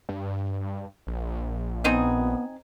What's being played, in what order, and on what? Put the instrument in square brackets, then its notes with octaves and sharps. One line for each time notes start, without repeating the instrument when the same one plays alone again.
[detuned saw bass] G2
A#1
[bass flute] B3 [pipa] C4 D#4 G#4